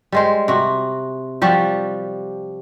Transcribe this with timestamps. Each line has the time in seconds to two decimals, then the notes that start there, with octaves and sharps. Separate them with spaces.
0.12 G3 G#3 C5
0.48 C3 F#4
1.42 F3 G3 F#4 G4